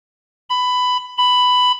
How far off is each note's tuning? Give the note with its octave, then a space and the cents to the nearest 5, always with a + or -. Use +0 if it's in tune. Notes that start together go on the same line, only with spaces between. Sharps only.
B5 +15
B5 +10